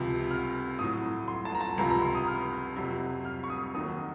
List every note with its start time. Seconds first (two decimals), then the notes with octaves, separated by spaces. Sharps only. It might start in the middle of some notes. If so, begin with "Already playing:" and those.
Already playing: C#2 C3 F3
0.31 F6
0.79 A2 F#3 D#6
1.28 C6
1.45 A5
1.55 A#5
1.61 A5
1.78 C#2 C3 F3 A#5
1.90 A#5
2.02 C6
2.15 D#6
2.27 F6
2.76 F2 C3 F#3
3.25 F6
3.44 C#6
3.50 D#6
3.74 D#2 D#3 F#3 D#6